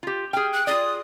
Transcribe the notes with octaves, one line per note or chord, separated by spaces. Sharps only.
F4 G4
G#4 G5 F6
F#6
F4 G#4 D5 D#6